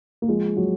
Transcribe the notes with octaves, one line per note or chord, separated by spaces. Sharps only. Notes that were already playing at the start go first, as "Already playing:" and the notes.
A#3
F3 G#3
F#3